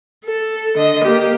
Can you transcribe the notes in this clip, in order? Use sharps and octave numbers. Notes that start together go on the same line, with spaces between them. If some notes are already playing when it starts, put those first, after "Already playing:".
A4
D3 D#5
A#3 G4